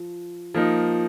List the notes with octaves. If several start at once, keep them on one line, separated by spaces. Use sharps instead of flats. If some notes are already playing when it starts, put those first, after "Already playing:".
Already playing: F3
F3 A#3 D#4